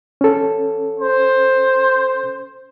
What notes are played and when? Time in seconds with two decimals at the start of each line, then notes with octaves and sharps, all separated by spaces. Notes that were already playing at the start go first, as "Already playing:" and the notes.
0.21 C#4 A4
1.00 C5